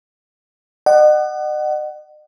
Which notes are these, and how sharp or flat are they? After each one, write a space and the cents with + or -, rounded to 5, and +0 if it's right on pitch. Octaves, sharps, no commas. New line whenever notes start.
D#5 -40 F#5 +20